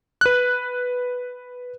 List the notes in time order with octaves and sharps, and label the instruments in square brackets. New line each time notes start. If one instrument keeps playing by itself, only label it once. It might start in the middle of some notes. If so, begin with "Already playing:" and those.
[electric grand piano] B4 F#6